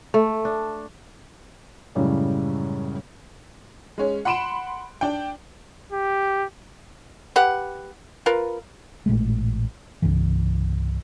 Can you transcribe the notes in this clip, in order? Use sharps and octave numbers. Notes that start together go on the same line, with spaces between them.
A3
D4
F#2 A2 C#3 G3 G#3
G#3 C#4
F#5 B5 C6 D7 E7
D4 G5
G4
G4 B4 F#5
F4 A#4 B4
A1 A#2 G#3 A3
C2 G2 C#3 E3